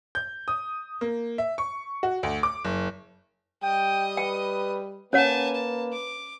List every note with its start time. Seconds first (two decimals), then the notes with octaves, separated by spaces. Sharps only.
0.15 G6
0.48 D#6
1.01 A#3
1.38 E5
1.58 C#6
2.03 F#4
2.23 D2
2.43 D6
2.65 F#1
3.63 G3 D#5 G5 D#6
4.17 B4 G5
5.13 A#3 C#4 B4 C#5 F#5 G#5 A5
5.55 A5
5.93 D6